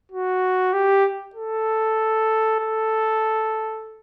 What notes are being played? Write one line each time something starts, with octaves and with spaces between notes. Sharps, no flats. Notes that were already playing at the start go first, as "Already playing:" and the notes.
F#4
G4
A4
A4